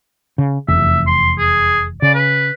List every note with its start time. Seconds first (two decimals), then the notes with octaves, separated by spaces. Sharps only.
0.38 C#3
0.68 F1 E2 E5
1.07 C6
1.38 G#4
2.02 C#3 D5
2.15 B4